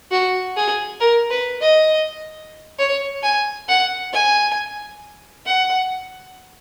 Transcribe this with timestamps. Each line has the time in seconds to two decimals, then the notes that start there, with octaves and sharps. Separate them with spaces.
0.11 F#4
0.56 G#4
1.00 A#4
1.30 B4
1.61 D#5
2.79 C#5
3.23 G#5
3.68 F#5
4.13 G#5
5.45 F#5